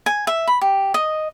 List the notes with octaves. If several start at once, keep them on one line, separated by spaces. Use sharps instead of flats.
G#5
E5
B5
G4
D#5